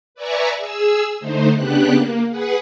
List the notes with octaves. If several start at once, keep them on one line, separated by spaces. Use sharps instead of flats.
B4 D5 E5 G#5 A#5 C#6
G#4 E6
D3 A3 D#4 C5
C#3 B3 D4 G4 F#6
A#3
G#4 B4 F#5